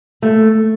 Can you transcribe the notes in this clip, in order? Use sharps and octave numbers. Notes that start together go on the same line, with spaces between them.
A3